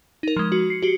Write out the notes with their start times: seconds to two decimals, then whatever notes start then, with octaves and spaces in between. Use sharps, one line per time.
0.23 D#4 A#4
0.36 F3 G#3
0.52 F#4
0.70 C7 C#7
0.82 F#4 G4